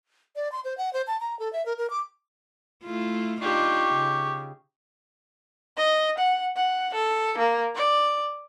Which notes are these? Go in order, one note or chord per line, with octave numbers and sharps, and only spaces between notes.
D5
C6
C5
F#5
C5
A5
A#5
A4
E5
A#4
A#4
D6
A3 E4 F4
D4 D#4 F4 G4 C#6
C#3
D#5
F#5
F#5
A4
A#3
D5